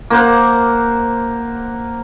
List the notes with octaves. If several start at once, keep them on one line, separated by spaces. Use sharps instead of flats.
A#3 C5 F#5